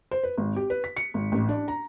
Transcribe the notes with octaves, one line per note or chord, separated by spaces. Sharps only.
C5
B4
G#1
G4
B4
B6
C#7
G#1
A1
D4
A#5